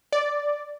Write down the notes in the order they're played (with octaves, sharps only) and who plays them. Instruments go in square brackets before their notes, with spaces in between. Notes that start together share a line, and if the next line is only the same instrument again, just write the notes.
[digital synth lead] D5